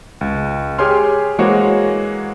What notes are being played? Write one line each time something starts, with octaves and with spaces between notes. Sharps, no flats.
C#2
G4 G#4 C#5 G#5 C6 F6
E3 G#3 A#3 F#4 C5 C#5